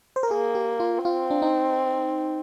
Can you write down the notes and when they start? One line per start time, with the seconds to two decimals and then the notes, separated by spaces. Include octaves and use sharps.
0.16 C5
0.23 A#4
0.31 A#3 G#4
0.55 G4
0.80 F4
1.05 C4 F4
1.31 D4
1.42 D#4